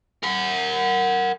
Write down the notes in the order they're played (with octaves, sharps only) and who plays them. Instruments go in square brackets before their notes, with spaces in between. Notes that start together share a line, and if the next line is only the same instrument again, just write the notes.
[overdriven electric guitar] A#4 F#5